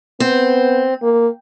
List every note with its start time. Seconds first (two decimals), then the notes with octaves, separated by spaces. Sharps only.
0.20 B3 C4
1.03 A#3